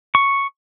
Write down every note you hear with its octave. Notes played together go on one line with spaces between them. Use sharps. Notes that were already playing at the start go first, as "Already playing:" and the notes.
C#6